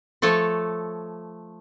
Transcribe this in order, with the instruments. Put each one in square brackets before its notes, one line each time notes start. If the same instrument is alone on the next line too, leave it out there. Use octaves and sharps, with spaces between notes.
[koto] F3 A3 A4 C#5